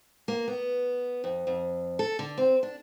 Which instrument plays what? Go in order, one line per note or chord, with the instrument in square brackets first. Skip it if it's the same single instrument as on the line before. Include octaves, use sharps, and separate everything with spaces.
[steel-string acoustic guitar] A#3
B3
F2
F2
A4
D3
C4
D4